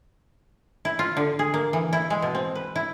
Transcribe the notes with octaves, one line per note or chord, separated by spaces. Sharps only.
E4
F4
D3
G#4
A#3
E3
E4
G#3
B2
C4
B4
E4